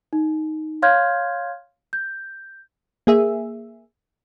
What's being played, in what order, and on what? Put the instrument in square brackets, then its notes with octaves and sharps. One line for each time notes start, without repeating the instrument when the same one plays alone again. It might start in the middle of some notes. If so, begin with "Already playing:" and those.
[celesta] D#4
C#5 F5 C6 F6 G6 G#6
G6
[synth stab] A#3 G#4 E5